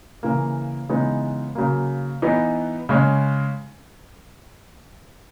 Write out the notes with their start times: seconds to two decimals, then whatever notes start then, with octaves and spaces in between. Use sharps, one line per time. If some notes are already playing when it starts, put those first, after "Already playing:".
0.23 C#3 E3 A#3
0.89 C#3 E3 G#3 B3 D#4
1.55 C#3 F#3 A#3
2.22 E3 B3 D#4
2.89 C#3 G#3 C#4